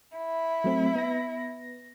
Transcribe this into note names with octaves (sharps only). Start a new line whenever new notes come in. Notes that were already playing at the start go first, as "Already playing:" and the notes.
E4
F#3 A3 C4
B3 A#6